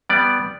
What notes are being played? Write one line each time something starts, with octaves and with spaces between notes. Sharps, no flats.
G3 B3 D5